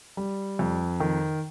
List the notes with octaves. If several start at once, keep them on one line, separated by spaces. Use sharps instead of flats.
G3
F2
D#3